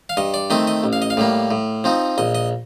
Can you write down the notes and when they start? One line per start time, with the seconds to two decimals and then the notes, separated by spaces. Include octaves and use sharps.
0.09 F5
0.17 G2 D#5
0.34 D5
0.50 D#3 A3 C4 D#5
0.67 D#5
0.84 A1
0.93 F5
1.02 D#5
1.10 F5
1.17 A2 G3 A#3
1.51 A2
1.84 F3 C4 D#4
2.18 A#1 D#5
2.35 D#5